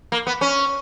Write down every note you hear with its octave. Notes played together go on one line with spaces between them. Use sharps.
A#3
B3
C#4